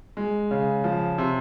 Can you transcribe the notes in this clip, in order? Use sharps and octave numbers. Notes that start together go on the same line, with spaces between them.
G#3
C#3
F3
C3